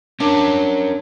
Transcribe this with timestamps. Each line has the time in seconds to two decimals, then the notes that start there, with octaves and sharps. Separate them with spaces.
0.20 C#4 D4 A#4